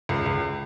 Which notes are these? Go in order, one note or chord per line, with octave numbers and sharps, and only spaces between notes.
C#2
C#2